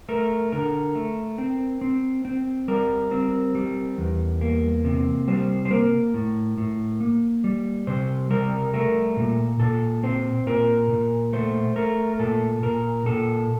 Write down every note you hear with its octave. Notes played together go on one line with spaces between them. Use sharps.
A3 A#4
D3 A#4
A3
C4
C4
C4
G3 A#4
C4
G3
E2
A#3
C3
G3 C5
C5
A#3 A#4
A2
A2
A#3
G3
C3 C5
G3 A#4
A3 A#4
A#2
A#2 A4
C4 C5
A#2 A#4
A#2
A3 C5
A3 A#4
A#2 A4
A#2 A#4
A#2 A4